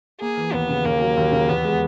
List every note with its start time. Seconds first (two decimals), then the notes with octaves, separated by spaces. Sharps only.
0.21 A#3 G#4
0.37 E3
0.53 D#2 B3
0.69 C#3
0.85 D#2 A#3
1.00 F#3
1.17 D#2
1.32 C#3
1.49 E2 B3
1.65 G#3